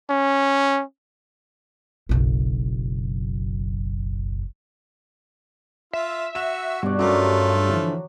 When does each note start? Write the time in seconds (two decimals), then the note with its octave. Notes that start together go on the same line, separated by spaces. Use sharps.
0.10 C#4
2.09 F#1 B1
5.93 F4 E5
6.35 F#4 E7
6.83 G2 B2 F#4 D5
6.99 F#3 A3 C#4 F4 F#4 A#4
7.69 D3 E3 F3